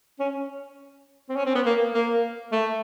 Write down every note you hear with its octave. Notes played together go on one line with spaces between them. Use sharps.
C#4
C4
C#4
C4
B3
A#3
A#3
A3